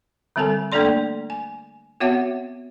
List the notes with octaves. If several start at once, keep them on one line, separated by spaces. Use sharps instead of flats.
D3 G3 C4 A4 G#5
A3 A#3 D4 A4 D5 C6
G#5
B3 C4 F#4 C#5 E5 F#5